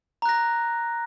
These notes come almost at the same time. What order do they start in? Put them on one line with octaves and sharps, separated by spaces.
A#5 F#6 A#6